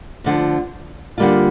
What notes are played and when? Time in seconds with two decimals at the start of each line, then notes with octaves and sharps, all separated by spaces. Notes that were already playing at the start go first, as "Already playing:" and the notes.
0.24 D2 D3 F3
1.18 D3 G3 A#3 F4